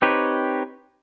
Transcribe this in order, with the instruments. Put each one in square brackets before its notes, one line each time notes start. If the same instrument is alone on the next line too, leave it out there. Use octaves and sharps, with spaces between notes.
[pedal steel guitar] C4 D#4 G4 B4 C#5